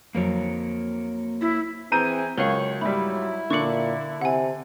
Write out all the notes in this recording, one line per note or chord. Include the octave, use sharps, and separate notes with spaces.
F2 F#3 A#3 A#4 C#5
E4
E3 C4 G#4 A#5 G6 D#7
C#2 F#3 A#4 C#5 F5
G#2 G3 E4 B5
A#2 D3 C#6 D6 C#7 F#7
C3 F#5 G#5